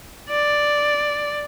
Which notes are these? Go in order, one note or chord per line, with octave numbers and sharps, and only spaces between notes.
D5